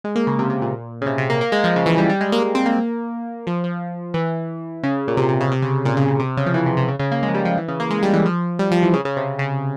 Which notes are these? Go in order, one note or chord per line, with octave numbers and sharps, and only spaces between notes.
G#3
A#3
C#3
C3
C3
A#2
C#3
C3
C3
A#3
A#3
G#3
F3
C#3
E3
G3
G3
G#3
A#3
A#3
C4
A#3
F3
F3
E3
C#3
A#2
C3
C3
C#3
C3
C#3
A#2
C#3
A#2
C3
C#3
F3
E3
C3
C3
C#3
C#3
A#3
G#3
F3
G3
F3
E3
C#3
A#3
G#3
G3
E3
F3
G3
F3
E3
C#3
C#3
C3
C#3